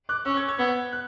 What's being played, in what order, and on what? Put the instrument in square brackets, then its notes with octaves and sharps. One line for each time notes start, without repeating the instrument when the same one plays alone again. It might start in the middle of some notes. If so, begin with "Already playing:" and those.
[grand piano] D6 F#6
[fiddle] C#4 [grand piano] C#6 E6
[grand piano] E6 G#6
E6 G#6
[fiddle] B3 [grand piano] E6 G#6
[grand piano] F#6